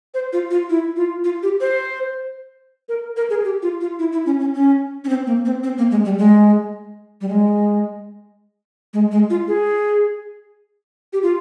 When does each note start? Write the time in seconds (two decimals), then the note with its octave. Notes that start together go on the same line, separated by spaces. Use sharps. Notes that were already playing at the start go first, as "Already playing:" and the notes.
0.14 C5
0.33 F4
0.51 F4
0.70 E4
0.97 F4
1.24 F4
1.43 G4
1.61 C5
2.89 A#4
3.17 A#4
3.30 G#4
3.45 G4
3.63 F4
3.81 F4
3.99 E4
4.12 E4
4.26 C#4
4.40 C#4
4.54 C#4
5.05 C#4
5.09 C4
5.27 A#3
5.45 C4
5.63 C4
5.78 A#3
5.91 G#3
6.05 G3
6.18 G#3
7.21 G3
7.29 G#3
8.94 G#3
9.12 G#3
9.30 F4
9.48 G#4
11.13 G4
11.23 F4